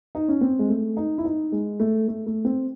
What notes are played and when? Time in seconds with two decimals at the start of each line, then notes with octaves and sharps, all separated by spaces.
0.15 D#4
0.28 C#4
0.41 C4
0.59 G#3
0.69 A3
0.97 D#4
1.18 E4
1.25 D#4
1.52 G#3
1.80 A3
2.08 A3
2.26 A3
2.45 C4